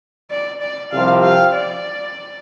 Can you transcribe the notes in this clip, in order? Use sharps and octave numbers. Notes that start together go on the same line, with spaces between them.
D5
D5
C2 C3 F3 C4 G4 F5
F5
D5